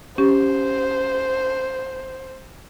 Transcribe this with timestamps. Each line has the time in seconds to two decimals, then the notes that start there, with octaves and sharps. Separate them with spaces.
0.18 C#4 G4 C5